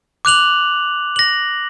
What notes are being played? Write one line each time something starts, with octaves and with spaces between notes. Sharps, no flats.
D6 F#6 F7 F#7
A#6 F#7